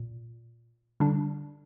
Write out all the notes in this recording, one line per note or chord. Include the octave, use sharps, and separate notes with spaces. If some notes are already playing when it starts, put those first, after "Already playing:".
Already playing: A#2
D3 G3 D4